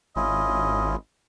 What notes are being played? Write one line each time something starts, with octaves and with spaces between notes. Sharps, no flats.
G#1 C#4 E4 F4 D#5